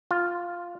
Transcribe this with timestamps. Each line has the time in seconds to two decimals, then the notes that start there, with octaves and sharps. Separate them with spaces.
0.11 F4